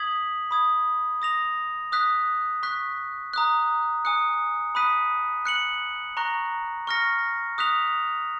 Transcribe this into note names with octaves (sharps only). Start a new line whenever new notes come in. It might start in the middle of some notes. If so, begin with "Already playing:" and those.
Already playing: D#6 G#6 B6 F#7
B5 D#6 G#6
D#6 A#6 F7
D#6 F#6 B6
C#6 F#6 B6
A#5 D#6 F#6
G#5 D#6 F#6 C#7
B5 D#6 F#6 B6 D#7
F#6 C#7 F#7
A#5 C#6 F#6 A#6
C#6 F6 A#6 C#7
D#6 F#6 B6 F7